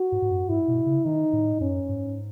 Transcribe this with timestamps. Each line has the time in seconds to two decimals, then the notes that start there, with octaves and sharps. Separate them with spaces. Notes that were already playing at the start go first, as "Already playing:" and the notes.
Already playing: F#4
0.12 G#2
0.22 G#2
0.31 F#2
0.49 G#2 E4
0.68 B2
0.86 C#3
1.05 D#3 D#4
1.33 A2
1.60 F#2 C#4
1.89 G#2